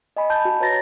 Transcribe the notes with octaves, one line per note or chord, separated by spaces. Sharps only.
D#5 G#5 B5
A5 B5 G6
F#4
B4 C#5 A#5 A6 A#6